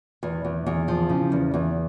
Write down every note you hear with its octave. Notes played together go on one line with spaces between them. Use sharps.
E2
E2
E2
F3
C#3
E2
E2